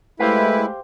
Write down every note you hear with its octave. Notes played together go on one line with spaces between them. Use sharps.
G#3 A3 E4 G4 B4 C5 F5